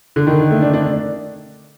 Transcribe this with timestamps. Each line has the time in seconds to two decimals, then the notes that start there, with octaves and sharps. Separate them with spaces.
0.16 D3
0.27 D#3
0.51 A3
0.62 D4
0.73 D4